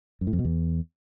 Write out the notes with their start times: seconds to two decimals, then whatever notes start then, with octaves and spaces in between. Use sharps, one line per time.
0.21 F#2
0.27 A2
0.33 F2
0.39 B2
0.45 E2